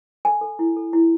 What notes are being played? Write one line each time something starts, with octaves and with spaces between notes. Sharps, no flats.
A4 G#5
A4
E4
A4
E4